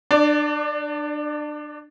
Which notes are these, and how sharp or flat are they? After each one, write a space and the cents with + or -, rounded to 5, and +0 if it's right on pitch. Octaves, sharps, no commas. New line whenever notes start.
D4 +25 D5 -10